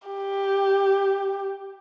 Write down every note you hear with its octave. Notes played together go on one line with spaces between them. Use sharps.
G4